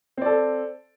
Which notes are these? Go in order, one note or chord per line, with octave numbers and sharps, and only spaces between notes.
C4 A4 D5